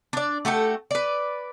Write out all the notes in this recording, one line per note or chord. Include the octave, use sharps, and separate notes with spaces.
D4 D5
A3 F#4 G4 A4
B4 D5